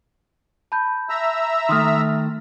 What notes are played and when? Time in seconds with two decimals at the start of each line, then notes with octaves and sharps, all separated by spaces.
0.72 A5 B5 G6
1.10 E5 A#5 E6
1.69 D#3 A3 C6 D#6 F6